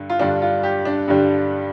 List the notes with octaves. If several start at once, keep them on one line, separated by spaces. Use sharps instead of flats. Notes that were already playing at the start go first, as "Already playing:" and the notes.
Already playing: G2 D3
F4
G2 D3 G3 D4
F4
G4
D4
G2 D3 G3